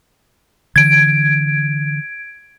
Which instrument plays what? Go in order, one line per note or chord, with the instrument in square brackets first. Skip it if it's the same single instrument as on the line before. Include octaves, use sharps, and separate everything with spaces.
[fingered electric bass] D3 E3 [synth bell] G#6 D7